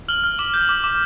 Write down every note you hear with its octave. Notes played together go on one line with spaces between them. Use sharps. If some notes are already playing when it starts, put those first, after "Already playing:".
F6 F#7
F6
D6 F#7
G6
D6
D6